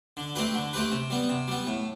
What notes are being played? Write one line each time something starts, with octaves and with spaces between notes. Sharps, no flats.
D3
A3 C4 G4 B4
D3
A3 C4 G4 B4
C3
G3 B3
C3
G3 B3
A2